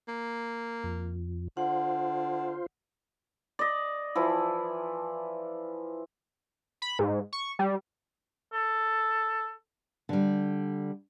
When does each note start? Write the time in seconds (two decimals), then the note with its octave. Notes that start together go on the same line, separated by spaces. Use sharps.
0.08 A#3
0.84 F2
1.57 D3 F4 C5 F#5
3.59 D5 D#5
4.15 E3 F3 E4
6.82 B5
6.99 G#2
7.33 C#6
7.59 G3
8.53 A4
10.09 D3 G3